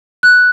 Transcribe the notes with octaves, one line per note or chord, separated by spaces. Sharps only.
F#6